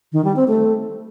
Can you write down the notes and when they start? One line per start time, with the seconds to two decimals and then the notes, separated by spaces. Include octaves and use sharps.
0.13 D#3
0.24 G3
0.36 C4
0.48 A3